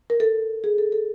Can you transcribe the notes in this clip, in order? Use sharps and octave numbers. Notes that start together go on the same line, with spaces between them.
A#4
A4
G#4
A4
A4